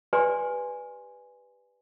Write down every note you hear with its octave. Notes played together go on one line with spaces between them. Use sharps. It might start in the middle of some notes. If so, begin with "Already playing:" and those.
G4 B4 D5 G#5 C6